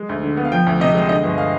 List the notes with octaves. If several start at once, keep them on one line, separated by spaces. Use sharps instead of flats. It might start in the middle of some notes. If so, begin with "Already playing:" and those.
Already playing: G#3
D2
D3
B3
F5
F3 G5
D2
C3 D#5
G#3
D3 D#5
G1
F5